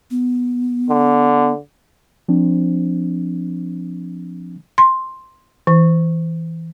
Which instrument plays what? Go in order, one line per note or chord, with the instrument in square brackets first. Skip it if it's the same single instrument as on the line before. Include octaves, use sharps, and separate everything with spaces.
[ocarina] B3
[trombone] D3
[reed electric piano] F3 C4 D4
[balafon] C6
E3